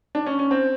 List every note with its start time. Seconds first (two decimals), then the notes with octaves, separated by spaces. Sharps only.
0.15 D4
0.26 C#4
0.39 C#4
0.51 C4